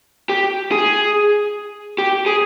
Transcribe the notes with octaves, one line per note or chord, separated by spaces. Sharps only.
G4
G#4
G4
G#4